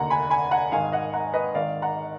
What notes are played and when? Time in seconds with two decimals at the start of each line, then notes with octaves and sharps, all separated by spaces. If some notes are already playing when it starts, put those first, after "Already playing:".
Already playing: F1 D#2 D3 F#5 A#5
0.10 G#5 B5
0.30 G#5 B5
0.51 F#5 A#5
0.72 G#1 G#2 D#3 F5 G#5
0.92 D#5 F#5
1.13 F#5 A#5
1.33 B4 D#5
1.55 G#1 G#2 D#3 D5 F5
1.82 F#5 A#5